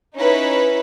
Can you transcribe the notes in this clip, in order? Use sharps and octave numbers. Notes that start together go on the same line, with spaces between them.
C#4 D#4 E4 B4